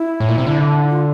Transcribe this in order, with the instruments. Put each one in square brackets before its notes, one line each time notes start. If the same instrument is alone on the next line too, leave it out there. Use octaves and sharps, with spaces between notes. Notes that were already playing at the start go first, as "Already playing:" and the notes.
Already playing: [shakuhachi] E4
[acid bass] A2
A#2
C3
D3
[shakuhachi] F4